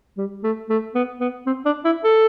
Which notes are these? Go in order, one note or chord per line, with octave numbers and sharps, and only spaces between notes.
G3
A3
A3
B3
B3
C4
D4
E4
A4